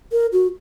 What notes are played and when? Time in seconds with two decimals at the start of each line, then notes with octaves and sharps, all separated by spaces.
0.12 A#4
0.32 F#4